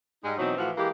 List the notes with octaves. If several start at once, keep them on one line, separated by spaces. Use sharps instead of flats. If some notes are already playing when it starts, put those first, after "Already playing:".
G#2 G3 G#3 D#4
B2 E3 F#3 C4 D#4
A2 E3 F3 F#4 F5
E3 G#3 A#3 G4